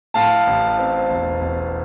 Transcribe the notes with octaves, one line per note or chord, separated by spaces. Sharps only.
A2 F5 A5
A1
C4
E1
E1